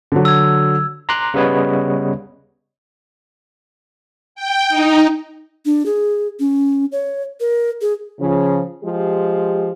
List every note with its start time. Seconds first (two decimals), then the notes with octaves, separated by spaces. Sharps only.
0.12 D3 F#3
0.25 E6 G#6
1.09 A#5 C6 D6 F#6
1.34 C#3 G3 B3 B4 C#5 D#5
4.35 G5
4.69 D#4
5.66 D4
5.86 G#4
6.40 C#4
6.92 C#5
7.40 A#4
7.81 G#4
8.20 C#3 F3
8.84 F3 G#3 G4